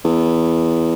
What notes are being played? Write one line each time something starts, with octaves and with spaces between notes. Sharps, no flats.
E2